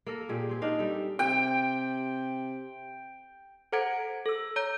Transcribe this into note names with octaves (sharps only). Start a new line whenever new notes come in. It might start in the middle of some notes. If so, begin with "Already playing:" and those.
A#3 A4 A#4
A#2 G4 G#4
C4 G#4
D4 D#4 F5
G3 A4
C3 G5
A4 C5 F#5 A#5 G#6 D7
A4 E6
C#5 A#5 G6